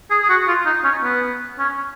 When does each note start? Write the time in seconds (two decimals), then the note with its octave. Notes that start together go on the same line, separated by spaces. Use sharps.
0.11 G#4
0.23 G#4
0.29 F#4
0.48 F4
0.66 D#4
0.84 C#4
1.03 B3
1.59 C#4